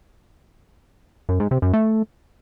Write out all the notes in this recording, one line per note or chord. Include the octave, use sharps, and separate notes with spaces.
F#2
G#2
C3
F#2
A3